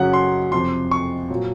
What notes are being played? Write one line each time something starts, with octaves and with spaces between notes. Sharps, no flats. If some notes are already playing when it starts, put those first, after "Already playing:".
Already playing: F#2 C#3 F#3 F#5
C6
F2 C3 F3 C6
C#6
A#2 F#3